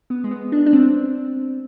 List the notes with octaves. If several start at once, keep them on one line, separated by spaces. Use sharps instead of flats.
B3
G#3
B3
D4
D4
C4